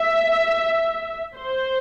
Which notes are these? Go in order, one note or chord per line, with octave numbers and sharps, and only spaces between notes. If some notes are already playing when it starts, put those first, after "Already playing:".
Already playing: E5
C5